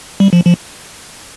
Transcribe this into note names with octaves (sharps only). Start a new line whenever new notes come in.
G3
F3
F3